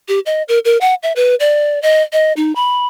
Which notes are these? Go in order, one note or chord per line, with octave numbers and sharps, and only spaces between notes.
G4
D#5
A#4
A#4
F#5
E5
B4
D5
D#5
D#5
D#4
B5